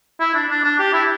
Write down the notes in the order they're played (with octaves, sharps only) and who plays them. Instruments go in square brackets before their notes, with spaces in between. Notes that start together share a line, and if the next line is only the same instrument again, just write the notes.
[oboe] E4
D4
D4
D4
G4
E4